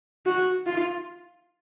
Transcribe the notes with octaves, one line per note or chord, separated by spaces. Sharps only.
F#4
F4